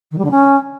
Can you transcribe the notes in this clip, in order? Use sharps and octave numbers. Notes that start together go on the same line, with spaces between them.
D#3
G3
D3
C#4